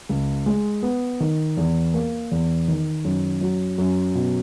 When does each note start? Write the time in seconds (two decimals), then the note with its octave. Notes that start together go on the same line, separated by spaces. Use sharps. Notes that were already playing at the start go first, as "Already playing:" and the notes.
0.09 C#2
0.46 G#3
0.82 B3
1.20 D#3
1.57 E2
1.94 A#3
2.31 E2
2.68 D#3
3.05 F#2
3.41 F#3
3.78 F#2
4.15 B2